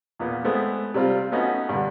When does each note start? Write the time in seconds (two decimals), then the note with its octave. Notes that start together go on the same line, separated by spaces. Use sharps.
0.20 E2 A#2 B3
0.44 G#3 A3 B3 C4 A4
0.94 C3 G3 C4 F4
1.32 A3 B3 C#4 D#4 F#4
1.69 G2 D3